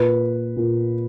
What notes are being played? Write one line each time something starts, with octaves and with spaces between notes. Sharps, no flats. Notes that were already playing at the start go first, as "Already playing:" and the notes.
Already playing: A#2 B4
A#2